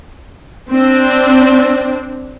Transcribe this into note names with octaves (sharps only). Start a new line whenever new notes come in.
C4 D4